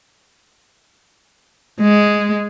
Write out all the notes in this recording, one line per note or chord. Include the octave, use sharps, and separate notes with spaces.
G#3